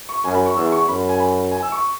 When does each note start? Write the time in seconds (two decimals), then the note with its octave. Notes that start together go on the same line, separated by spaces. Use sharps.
0.09 C#6
0.24 F#2 G#5
0.35 B5
0.46 C#6
0.56 E2 E6
0.72 C#6
0.88 F#2 B5
1.09 G#5
1.20 B5
1.52 G#5
1.63 E6
1.72 C#6